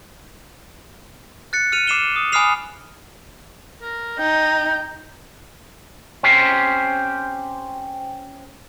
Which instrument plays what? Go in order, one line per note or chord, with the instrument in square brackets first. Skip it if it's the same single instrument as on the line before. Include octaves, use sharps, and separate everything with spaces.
[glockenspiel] F#6 A6 C#7
F6 C#7 D#7 F7
D6 C7 E7 F7 G7
D#6
G#5 B5 D#6 F6 C7 F7
[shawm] A#4
[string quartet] D#4 [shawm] G5
[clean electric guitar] C4 C#4 G4 C5